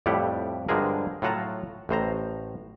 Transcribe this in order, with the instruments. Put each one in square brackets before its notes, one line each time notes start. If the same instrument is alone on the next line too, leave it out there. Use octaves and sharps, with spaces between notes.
[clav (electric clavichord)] F2 A2 G3 E4 G4 F#5
G2 D3 F3 G#3 G#4 A#4
A2 F#3 F4 F#5 A5 A#5
A1 A2 C5 A#5